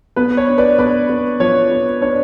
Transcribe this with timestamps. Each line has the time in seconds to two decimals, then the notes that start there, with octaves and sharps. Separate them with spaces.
0.16 B3 B4
0.37 C#5
0.48 D4
0.58 B4 D5
0.79 B3 B4 D5
1.09 B3
1.40 F3 C#5
1.71 B3
2.01 D4 C#5